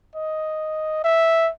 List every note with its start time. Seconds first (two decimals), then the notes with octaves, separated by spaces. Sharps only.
0.15 D#5
1.04 E5